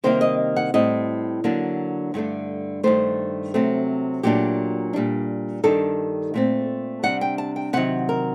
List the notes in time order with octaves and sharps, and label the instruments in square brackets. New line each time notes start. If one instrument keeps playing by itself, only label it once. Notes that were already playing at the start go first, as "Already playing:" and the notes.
[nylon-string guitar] C3 D#3 G3 A#3 C5
D#5
F#5
A2 G3 C4 D#5
D3 F#3 A#3 D4
G2 D3 A3 D4
G2 D#3 A3 C5
C3 F#3 A3 C4
A#2 F#3 A3 D4 G4
A#2 G3 D4
G2 D#3 G3 D4 A4
A#2 A3 C4
C3 G3 D4 F#5
G5
A5
G5
C3 D#3 F#3 F#5
A#4